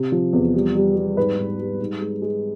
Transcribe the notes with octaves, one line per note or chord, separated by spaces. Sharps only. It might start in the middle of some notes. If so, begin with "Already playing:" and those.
Already playing: C3
F3
E2
G3
G3
G3
G#2 B4
G#2
G3
G#2
G#3
G#3